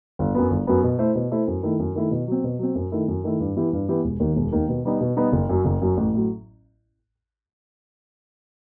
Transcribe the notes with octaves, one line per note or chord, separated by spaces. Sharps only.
G1
F#2 F#3 B3
G1
F#2 F#3 B3
B2
A3 E4 A4 C5
B2
A3 E4 A4 C5
F#2
D#3 A3 E4
F#2
D#3 A3 E4
B2
F#3 C4
B2
F#3 C4
F#2
D#3 A3 E4
F#2
D#3 A3 E4
G2
E3 B3 E4 G4
G2
E3 B3 E4 G4
E1
D#2 D#3
E1
D#2 D#3
B2
G3 B3 D#4
B2
G3 B3 D#4
F#1
F#2 F#3
F#1
F#2 F#3
A1
A2 F#3